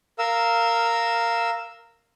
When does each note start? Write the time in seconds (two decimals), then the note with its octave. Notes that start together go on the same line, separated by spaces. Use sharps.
0.19 A#4 F5 E6